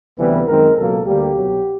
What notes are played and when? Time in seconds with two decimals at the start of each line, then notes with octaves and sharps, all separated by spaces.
0.18 D2 C3 E3 G3 B3 B4
0.46 F#2 D#3 G#3 C4 A#4
0.76 C#2 B2 F#3 A#3 A4
1.05 D2 D3 G3 A#3 G4
1.35 C2 B2 F#3